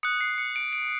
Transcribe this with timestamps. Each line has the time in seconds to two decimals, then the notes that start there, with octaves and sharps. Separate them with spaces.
0.03 D#6 F#6 C#7
0.21 C7
0.38 C#7
0.56 D7
0.73 D7